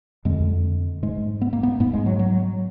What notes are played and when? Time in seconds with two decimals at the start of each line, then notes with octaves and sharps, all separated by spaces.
0.25 F2 D3 G#3
1.03 G#2 G#3
1.42 B3
1.53 A#3
1.63 B3
1.80 G#2 B3
1.93 G#3
2.06 F#3
2.19 F#3